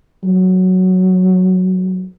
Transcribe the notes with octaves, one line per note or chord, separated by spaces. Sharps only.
F#3